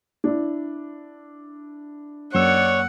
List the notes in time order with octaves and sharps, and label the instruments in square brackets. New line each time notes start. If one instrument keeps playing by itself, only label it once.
[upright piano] D4 E4
[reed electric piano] F#2 A#3 E6 [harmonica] C#5 D5 [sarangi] F#5